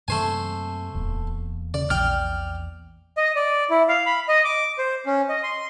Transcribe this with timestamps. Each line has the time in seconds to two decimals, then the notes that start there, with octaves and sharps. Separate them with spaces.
0.08 F#2 C3 A3 A#3 C5 G#5
0.95 D1 E2 A#3
1.74 C#3 D5
1.90 A#1 D5 G5 F6
3.17 D#5
3.36 D5
3.70 E4
3.89 F5
4.06 B5
4.29 D#5
4.45 D6
4.78 C5
5.06 C#4
5.29 D#5
5.43 C6